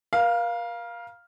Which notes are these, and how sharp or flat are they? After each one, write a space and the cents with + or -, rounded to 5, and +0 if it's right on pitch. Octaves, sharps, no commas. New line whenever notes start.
A#4 +40 F5 +0